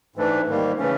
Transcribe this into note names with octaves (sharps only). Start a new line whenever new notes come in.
G#2 E3 A3 D4
G#2 D#3 G3 A#3
C#3 E3 A3 C#4